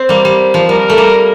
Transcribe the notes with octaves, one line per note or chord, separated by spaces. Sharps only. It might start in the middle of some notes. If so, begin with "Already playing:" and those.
Already playing: C4 C5
G3 A#3
G3
F3
G3 A#4
A3
G3 A#3